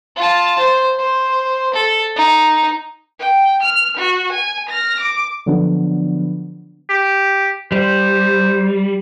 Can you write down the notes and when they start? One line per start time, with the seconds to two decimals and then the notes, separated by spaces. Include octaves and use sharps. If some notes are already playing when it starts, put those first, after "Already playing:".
0.16 F4 A5
0.59 C5
0.99 C5
1.74 A4
2.16 D#4
3.20 G5
3.62 F6
3.97 F#4
4.32 G#5
4.69 F6 A#6
5.00 D6
5.46 D3 F3 F#3 B3 D4
6.89 G4
7.72 G3 C5